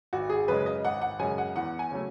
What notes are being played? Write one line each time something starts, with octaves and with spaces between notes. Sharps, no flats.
G#1 F#4
G#4
F#2 C#3 G#3 B4
D#5
G#1 F#5
F#5
F#2 C#3 G#3 G#5
F#5
E2 F#5
G#5
C#3 F#3 A3